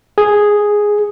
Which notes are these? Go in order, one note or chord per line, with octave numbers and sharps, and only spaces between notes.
G#4